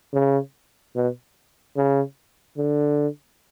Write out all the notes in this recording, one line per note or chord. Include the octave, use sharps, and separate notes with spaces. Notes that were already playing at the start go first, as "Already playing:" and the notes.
C#3
B2
C#3
D3